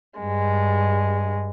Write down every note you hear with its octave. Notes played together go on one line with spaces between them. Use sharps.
G2 G#3